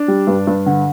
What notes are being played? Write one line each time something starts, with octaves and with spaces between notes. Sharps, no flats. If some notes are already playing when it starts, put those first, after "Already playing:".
Already playing: D4
G3
G2
G2
D3